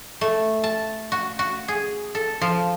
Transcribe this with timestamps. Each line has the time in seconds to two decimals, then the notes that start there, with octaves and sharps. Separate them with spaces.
0.21 A3
0.64 A5
1.12 F#4
1.39 F#4
1.68 G#4
2.15 A4
2.41 F3